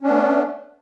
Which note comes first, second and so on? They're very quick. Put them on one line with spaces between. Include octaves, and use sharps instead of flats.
C#4 D4 B3 A3